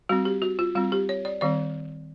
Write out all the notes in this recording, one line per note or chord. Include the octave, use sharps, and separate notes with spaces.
G3 C4 F#4
G4
F#4
F4
G3 C4 F4
G4
C#5
D5
D#3 G3 C4 D5